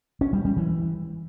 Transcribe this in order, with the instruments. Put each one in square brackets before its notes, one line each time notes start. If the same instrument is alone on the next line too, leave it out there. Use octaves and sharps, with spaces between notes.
[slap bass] C#4
G3
G3
E3